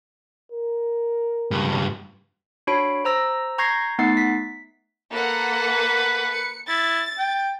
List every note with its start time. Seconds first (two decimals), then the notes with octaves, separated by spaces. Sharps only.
0.52 A#4
1.51 C#2 G2
2.67 D4 F#4 C#5 B5 D7
3.05 C5 A#5 E6 A#6
3.58 A#5 C#6 G6 G#6 A#6 C7
3.99 A3 B3 D#4 F#5 A6 C7
4.17 B6
5.13 A#3 A4 B4 F#5
6.31 C#7
6.69 E4 A6
7.18 G5